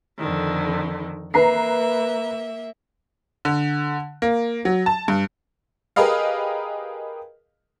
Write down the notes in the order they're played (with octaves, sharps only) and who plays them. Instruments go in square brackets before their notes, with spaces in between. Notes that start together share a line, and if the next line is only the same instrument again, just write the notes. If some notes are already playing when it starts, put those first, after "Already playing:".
[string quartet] F2 D3 D#3
[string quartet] A#3 E5 [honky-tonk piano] B4 A#5 C7
[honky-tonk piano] D3
A#3
F#3
A5
G2
G4 G#4 A#4 B4 D#5 F5